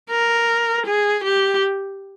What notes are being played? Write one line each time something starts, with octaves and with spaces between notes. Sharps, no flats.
A#4
G#4
G4